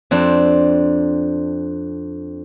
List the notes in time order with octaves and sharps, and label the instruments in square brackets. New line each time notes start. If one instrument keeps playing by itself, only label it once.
[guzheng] F2 C4 D4